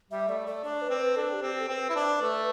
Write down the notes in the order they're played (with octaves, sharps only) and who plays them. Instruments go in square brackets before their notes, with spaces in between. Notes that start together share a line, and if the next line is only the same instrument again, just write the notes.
[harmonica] G3 [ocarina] E5
[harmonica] A3 [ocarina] D5
[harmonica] A3 [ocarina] D5
[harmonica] D4 [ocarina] D5
[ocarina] B4
[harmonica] C4
[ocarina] B4
[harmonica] D4 [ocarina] A4
[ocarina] G4
[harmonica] C4
[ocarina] A4
[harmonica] C4 [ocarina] B4
[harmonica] E4
D4
A3